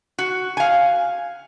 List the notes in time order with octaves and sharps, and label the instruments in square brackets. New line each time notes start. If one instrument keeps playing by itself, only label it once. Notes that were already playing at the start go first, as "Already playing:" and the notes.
[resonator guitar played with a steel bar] F#4
F5 G#5